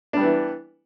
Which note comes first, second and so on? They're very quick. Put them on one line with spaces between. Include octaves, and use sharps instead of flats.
D4 G3 B3 E3